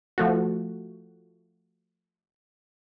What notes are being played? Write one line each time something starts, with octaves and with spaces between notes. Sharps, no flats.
F3 A3 F#4